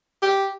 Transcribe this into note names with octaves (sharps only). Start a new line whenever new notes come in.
G4